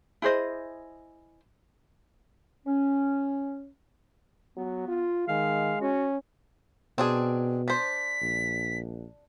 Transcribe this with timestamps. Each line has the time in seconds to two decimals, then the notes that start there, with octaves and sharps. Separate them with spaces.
0.22 E4 G#4 C5 D#5
2.67 C#4
4.57 F#3 B3
4.88 F4
5.29 D#3 G#3 F5
5.81 C#4 F#4
6.98 B2 C4 D4 G#4
7.68 D4 C5 B6
8.22 A#1